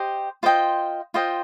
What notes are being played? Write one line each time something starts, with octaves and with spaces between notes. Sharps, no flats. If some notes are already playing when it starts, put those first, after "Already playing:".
Already playing: G4 C5 D#5
F4 C5 D#5 G5
F4 C5 D#5 G5